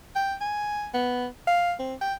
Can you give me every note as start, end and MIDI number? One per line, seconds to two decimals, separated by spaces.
0.15 0.34 79
0.41 0.88 80
0.94 1.26 59
1.47 1.73 77
1.79 1.94 60
2.01 2.14 79